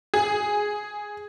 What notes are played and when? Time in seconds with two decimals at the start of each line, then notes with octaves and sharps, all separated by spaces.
0.14 G#4